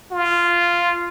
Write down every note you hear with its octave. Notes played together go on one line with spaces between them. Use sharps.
F4